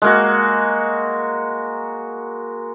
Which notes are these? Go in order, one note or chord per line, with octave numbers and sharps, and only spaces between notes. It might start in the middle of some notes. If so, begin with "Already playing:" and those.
G#3 A#3 F#4